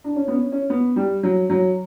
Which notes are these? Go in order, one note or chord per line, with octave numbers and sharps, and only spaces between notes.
D4
C#4
B3
C#4
C#4
B3
G3
F#3
F#3